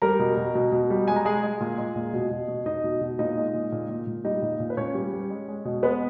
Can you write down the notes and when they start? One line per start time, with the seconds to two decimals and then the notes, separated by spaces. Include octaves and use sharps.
0.02 G3 A#4 A#5
0.19 B2
0.37 B2
0.55 B2
0.72 B2
0.90 G3
1.08 G#3 G#5
1.16 A#5
1.25 G#3 G#4 G#5
1.43 G#3
1.61 A#2
1.78 G#3
1.96 A#2
2.13 B2
2.31 B2
2.48 B2
2.66 B2 D#4 D#5
2.84 B2
3.01 B2
3.19 A#2 D#4 D#5
3.37 G#3
3.54 A#2
3.72 A#2
3.89 A#2
4.07 A#2
4.24 G3 D#4 D#5
4.42 A#2
4.60 A#2
4.70 B4
4.77 A#2 C#4 C#5
4.94 G3
5.13 G3
5.30 G#3
5.48 G#3
5.65 B2
5.83 G#3 B3 B4